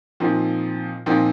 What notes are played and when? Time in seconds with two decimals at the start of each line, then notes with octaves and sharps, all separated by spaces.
0.20 A#2 F3 C4 D#4
1.06 A#2 F3 C4 D#4